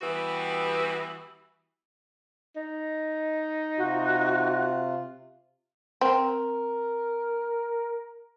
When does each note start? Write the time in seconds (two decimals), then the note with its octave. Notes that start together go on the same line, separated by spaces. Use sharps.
0.01 E3 G3 B3 F#4 G4 B4
2.57 D#4
3.78 C3 F4 F#4
6.01 C4 A#4